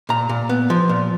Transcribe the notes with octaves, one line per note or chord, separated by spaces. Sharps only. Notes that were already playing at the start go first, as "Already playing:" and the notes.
A#2 A#5
A#2
B3
F3
A#2